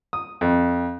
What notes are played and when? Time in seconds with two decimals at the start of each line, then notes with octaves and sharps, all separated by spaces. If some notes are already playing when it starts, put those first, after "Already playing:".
0.13 D#6
0.41 F2